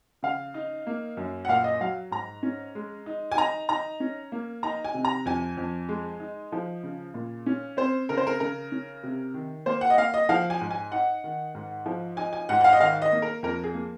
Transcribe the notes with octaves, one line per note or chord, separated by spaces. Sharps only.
C#3 F5
D#4
A#3
F#2
F#5
A#2 F5
D#5
F#3 F5
G#2 A#5
C#4
G#3
D#4
G#5
D#4 A#5
D#4 A#5
C#4
A#3
D#4 A#5
G#5
C3
A#5
F2 G#5
F2
G#3
D#4
F3
C#3
A#2
C#4
C4 C5
C#3 A#4
C5
A#4
C#3 A#4
C#4
C3
D#3
A#3 C5
F#5
D#5
A#3 F5
D#5
F3 F5
G#5
G#2
G#5
D#4 F#5
D#3
G#2
F3
D#4 G#5
G#5
G#2 F#5
F#5
F5
D#5
D#3 F5
D#5
A#3
A#4
F2 A#4
G#4
A#3